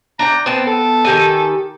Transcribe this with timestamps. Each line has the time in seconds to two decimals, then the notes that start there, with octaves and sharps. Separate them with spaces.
0.19 D4 G5 A#5
0.46 B3 C4 A5
0.66 A4
1.05 D#3 G4 G#5